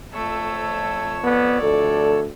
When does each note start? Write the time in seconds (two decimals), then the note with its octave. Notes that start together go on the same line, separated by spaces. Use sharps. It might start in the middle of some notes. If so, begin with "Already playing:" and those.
0.14 F2 A3 C#5 E6
1.24 B3 D5
1.62 D2 A4